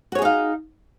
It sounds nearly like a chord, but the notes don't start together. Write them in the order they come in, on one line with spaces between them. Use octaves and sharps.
F#4 C#5 G#4 D#4 F5